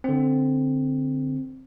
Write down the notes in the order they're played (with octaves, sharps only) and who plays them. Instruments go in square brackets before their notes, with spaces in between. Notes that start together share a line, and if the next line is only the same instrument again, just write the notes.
[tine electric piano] D3 C4